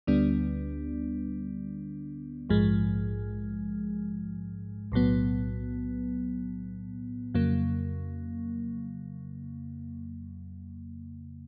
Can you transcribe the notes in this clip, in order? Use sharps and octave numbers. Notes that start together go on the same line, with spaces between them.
D2 D3 G3 B3 D4
A#1 G#2 F3 G#3
B1 A2 F#3 B3
F2 C#3 F#3 A#3